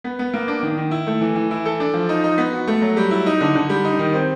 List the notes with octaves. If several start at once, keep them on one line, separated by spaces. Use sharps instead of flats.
B3
B3
A#3
D4
D#3
D#3
E4
A3
E3
E3
E4
A4
D4
F3
D#4
D#4
B3
F#4
A3
F#3
G3
E4
D#4
D3
D3
G3
D#4
D#3
C4